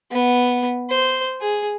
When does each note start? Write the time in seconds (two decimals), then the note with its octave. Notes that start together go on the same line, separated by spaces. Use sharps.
0.11 B3
0.90 C5
1.41 G#4